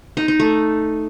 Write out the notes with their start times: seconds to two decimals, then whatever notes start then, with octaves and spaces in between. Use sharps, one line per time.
0.17 D#4
0.28 D#4
0.40 A3